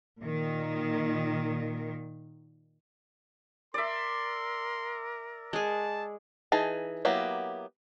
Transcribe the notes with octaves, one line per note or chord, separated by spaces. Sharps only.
A#2 D#3
A#4 D5 E5 C6
G#3 G#4 A5
E3 D#4 G#4 A5
F#3 A#3 B3 E4 G4